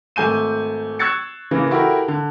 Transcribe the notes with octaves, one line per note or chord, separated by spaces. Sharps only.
G#1 A3 G#5 G6 D#7
C#6 E6 F#6 G#6 A6 C#7
C#3 E3 A#3
E4 F#4 G4 A4 A#4
D3